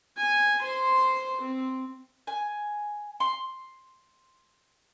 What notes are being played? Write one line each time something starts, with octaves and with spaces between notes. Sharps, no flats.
G#5
C5 C6
C4
G#5
C6